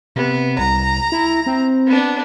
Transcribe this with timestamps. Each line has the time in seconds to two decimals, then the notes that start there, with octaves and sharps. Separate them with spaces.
0.16 C3 B3
0.59 C2 A#5
1.12 E4
1.46 C4
1.87 B3 D4